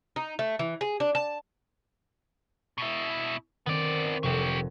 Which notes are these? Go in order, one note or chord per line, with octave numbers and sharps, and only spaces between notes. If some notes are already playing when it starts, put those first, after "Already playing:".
D#4
A3
E3
G#4
D4
A5
B2 E4
D#3 B3 C4 D5
F1 F#3 G4